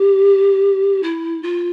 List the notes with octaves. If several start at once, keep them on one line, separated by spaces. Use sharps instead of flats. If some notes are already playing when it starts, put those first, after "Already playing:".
Already playing: G4
E4
F4